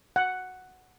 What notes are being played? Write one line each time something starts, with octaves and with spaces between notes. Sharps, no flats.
F#5